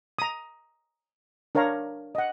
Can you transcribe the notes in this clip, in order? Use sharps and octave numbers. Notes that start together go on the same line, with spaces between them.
A#5 D#6
D4 A#4 C#5 F5 A#5
D#5 F#5